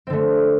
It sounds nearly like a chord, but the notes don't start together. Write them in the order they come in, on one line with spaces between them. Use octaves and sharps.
C4 D3 A3